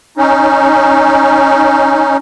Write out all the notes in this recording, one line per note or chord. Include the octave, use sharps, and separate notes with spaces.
C#4 D#4